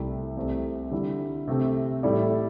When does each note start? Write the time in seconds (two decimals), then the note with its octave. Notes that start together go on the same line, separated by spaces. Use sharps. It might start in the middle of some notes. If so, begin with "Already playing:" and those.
Already playing: C2 C3 A3 E4 G4
0.37 C2 C3 A3 C4
0.91 D3 G3 E4
1.48 C3 A3 C4
2.03 A2 G3 E4 A4 D5